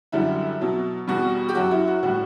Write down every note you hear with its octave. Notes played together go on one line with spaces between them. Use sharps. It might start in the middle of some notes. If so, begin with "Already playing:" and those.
F#2 D3 G3 E4
B2 F#3
E2 B2 G3 F#4
G4
F#2 F#3 F#4
E4
F#4
A2 G3 F#4